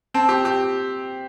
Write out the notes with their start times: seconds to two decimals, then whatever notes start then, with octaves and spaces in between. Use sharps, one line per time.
0.14 C4 A5
0.29 G4
0.45 G4